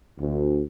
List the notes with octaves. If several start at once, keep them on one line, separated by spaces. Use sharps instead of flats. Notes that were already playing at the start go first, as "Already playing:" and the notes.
D2